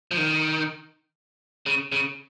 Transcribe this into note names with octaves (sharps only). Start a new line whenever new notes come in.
F3
D#3
C#3
C#3